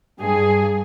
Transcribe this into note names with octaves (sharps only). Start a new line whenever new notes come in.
G2 G#4